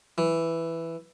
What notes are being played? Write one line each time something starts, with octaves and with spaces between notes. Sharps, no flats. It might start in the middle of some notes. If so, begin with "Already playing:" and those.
E3